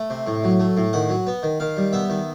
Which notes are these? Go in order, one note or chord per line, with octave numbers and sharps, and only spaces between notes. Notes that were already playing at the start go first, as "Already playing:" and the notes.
Already playing: A3
C3
A2
F#3
A3
A2
D#3 F#5
F#3
B3
D#3
D#3 F5
G3
B3 E5
D#3